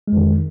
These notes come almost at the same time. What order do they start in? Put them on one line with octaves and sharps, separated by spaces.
G#3 F2 D#3